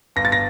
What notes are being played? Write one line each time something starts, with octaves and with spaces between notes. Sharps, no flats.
G1 A#6
A6
A#6